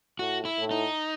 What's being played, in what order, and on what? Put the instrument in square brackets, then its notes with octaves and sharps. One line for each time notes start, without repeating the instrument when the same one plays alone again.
[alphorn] A2 [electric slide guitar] F#4
[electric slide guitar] E4
[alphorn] A2
[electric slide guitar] D#4